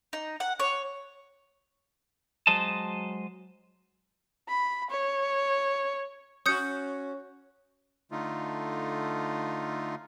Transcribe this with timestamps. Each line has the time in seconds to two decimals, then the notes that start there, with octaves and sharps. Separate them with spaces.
0.13 D#4
0.40 F#5
0.60 C#5
2.47 F#3 G#3 C5 D#5 A5
4.49 B5
4.91 C#5
6.46 C#4 F#4 D#6 G6 C#7
8.11 D3 A3 D#4 F4